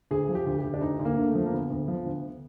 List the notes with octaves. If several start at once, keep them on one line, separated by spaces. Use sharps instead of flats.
D2 G#4
F3
G4
D2
G4
D2
D4
D2 D#4
D2
A#3
D3
A3
F3
A#3
D2 B3
D2
F3
D2